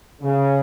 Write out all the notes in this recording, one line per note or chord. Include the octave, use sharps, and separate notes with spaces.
C#3